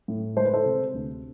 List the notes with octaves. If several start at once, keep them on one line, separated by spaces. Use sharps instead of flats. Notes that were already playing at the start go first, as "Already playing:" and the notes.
A2
G#3 C5
B4
A4 C5
C3
D2